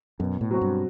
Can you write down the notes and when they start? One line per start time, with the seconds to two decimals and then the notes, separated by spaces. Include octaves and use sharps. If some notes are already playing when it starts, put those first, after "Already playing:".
0.19 F#2 B2
0.41 A2
0.51 F#3 C4 F#4
0.61 G2